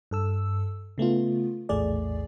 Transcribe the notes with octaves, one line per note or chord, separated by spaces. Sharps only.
G2 A4 E6
C#3 A3 B3 F4
A#1 E2 A2 A3 G#4 D5